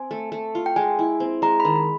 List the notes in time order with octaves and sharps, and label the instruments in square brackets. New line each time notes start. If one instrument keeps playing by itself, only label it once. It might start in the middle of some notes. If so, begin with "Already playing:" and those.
Already playing: [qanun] C4 [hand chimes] G#5
[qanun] A3
A3
F4
[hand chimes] G5
[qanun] G#3 [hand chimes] G#5
[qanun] E4
C4
[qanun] G#3 [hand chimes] A#5
[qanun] D#3 [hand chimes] B5
[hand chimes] B5